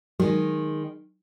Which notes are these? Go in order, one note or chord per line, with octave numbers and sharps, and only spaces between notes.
D#3 F#3 G#3